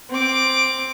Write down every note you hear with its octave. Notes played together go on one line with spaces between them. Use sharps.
C4 D6